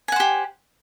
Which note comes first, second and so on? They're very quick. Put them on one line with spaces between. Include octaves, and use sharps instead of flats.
G#5 F#5 C5 G4